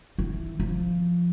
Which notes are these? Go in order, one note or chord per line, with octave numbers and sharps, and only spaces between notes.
E3
F3